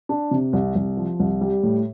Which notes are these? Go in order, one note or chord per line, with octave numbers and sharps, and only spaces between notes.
D4
C3
C2
C2
F3
C2
G3
A2